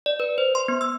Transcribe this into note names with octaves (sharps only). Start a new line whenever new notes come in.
D5
B4
C5
C6
B3
E6